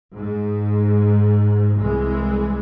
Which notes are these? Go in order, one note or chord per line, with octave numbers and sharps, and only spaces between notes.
G#2
C2 E3 G#3